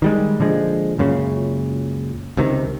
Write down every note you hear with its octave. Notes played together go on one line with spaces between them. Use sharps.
D#3 G3 G#3
A#2 D3 F3 G#3
C#2 F#2 A#2 C#3
C#2 C3 D#3